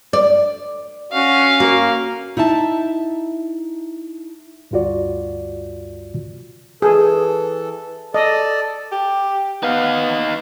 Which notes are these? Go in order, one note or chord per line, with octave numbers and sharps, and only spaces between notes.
D5
C#4 F#4 F5
A#3 F#4
D#4 E4 E5 A5
D2 G2 F4 F#4 D5
E3 G#4 A4
A4 D5 D#5
G4
B3 D#4 F5